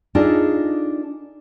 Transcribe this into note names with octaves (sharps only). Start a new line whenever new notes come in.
D4 D#4 F4 G#4 A4 D#5